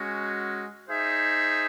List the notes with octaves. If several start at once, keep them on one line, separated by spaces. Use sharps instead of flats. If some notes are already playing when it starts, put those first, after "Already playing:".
Already playing: G#3 C#4 F#4
D#4 G#4 C5 E5